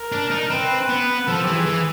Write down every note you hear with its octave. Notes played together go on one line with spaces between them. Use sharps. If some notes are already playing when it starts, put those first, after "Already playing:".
Already playing: A#4
D4
D#4
C4 B4
B3
F3 A4
E3 G4
G#4
E3